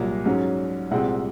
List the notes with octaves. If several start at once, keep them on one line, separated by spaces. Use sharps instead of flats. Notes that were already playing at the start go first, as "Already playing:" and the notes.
Already playing: C2 A#2 F#3 A#3
G#2 F#3 C#4
C2 A#2 G#3 C4 F#5